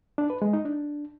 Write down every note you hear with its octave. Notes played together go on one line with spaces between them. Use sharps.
D4
B4
G#3
D#4
D4